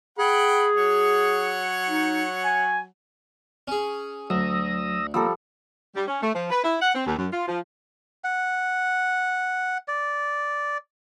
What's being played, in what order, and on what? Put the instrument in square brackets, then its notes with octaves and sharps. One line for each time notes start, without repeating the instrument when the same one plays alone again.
[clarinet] G#4 [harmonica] F#5 G5 B5
[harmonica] F#3 C#5 F#5
[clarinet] D#4
G#5
[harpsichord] C#4 G#4
[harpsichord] D2 [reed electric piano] F#3 [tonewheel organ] D#6 E6 A#6
[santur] F3 G3 A4 [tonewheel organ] A#3 A#5 [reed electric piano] E6
[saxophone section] G3
C#4
A3
F3
B4
E4
F#5
C4
D#2
F#2
F4
F3
[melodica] F#5
D5